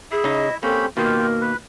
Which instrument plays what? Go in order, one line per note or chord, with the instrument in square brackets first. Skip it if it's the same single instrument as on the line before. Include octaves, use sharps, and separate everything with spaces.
[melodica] E4 E5 [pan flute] G#4
[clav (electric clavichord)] C#3 D#4 [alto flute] D#5
[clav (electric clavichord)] A#3 [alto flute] C4 [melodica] C#4 G4 B5 [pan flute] A4
[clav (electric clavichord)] B2 D#3 [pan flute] A#3 [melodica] F4 G4 [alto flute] A#4
[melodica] B4